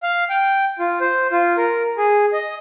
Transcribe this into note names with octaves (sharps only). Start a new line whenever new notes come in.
F5
G5
F4
C5
F4
A#4
G#4
D#5